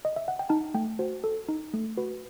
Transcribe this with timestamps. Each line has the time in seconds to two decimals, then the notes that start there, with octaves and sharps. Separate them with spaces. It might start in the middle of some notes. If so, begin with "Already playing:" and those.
0.05 D#5
0.16 E5
0.28 F#5
0.39 G5
0.49 D#4 A5
0.74 A3 G5
0.99 F#4 C5
1.24 A4
1.49 D#4
1.74 A3
1.97 F#4 B4